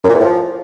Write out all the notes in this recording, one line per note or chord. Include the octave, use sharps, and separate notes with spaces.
F#2
A#2
E2
A2
F3